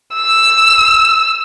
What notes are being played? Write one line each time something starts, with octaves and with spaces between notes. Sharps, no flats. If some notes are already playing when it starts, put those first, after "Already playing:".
E6